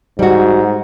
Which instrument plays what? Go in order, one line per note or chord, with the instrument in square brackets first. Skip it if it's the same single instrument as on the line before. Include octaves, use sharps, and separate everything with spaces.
[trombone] G#2 [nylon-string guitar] G3 F#4